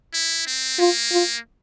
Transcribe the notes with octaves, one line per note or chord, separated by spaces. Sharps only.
E4
C4
A#3 F4
F4